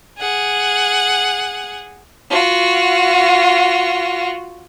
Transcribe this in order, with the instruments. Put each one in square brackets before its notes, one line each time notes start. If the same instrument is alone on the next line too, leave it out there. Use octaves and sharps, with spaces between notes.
[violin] G#4 F#5
F4 F#4